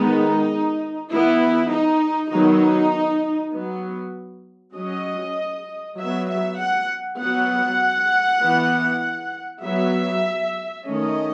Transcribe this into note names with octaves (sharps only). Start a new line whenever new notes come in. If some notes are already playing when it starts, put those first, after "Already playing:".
Already playing: D#3 G#3 B3 D#4
E3 B3 E4
D#4
D#3 F#3 B3 D#4
F#3 B3
F#3 C#4 D#5
F#3 B3 E5
E5
F#5
F#3 B3 F#5
E3 B3
F#3 B3 E5
D#3 A3 C#4 D#5